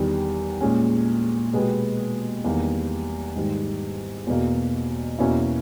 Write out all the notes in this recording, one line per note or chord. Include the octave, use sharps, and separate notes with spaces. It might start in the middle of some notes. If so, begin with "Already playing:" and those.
Already playing: E2 D#3 G3
A#2 G#3 C#4
B2 G#3 B3 G4
E2 D#3 G3 A#3
G#2 D#3 G3
E2 B2 A#3
E2 B2 A#3 C#4 E4